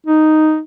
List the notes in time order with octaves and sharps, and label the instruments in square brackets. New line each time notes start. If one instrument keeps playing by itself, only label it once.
[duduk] D#4